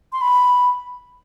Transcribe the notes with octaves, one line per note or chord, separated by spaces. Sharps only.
C6
B5